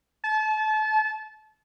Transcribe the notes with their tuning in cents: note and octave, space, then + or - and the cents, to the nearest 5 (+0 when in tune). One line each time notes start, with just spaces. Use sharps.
A5 -30